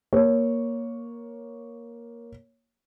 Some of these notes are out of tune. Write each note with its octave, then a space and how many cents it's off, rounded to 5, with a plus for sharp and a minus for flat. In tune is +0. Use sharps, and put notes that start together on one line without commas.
A#3 +10 C#5 +0